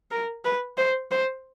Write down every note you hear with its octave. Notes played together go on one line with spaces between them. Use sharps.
A#4
B4
C5
C5